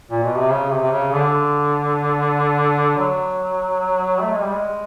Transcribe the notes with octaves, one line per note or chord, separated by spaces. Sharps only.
A#2
B2
C3
C#3
C3
C3
C#3
D3
F#3
A3
G#3
G3
G#3